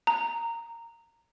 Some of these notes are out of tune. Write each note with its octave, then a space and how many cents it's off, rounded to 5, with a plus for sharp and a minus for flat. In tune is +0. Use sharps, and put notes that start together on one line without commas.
A#5 -10